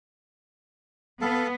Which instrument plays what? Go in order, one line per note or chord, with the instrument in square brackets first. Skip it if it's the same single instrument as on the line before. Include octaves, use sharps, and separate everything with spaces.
[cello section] B3 [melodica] A4 F5 A5